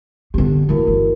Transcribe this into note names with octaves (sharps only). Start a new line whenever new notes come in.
D3 B3 G4
E3 A#3 E4 F#4 A#4
G1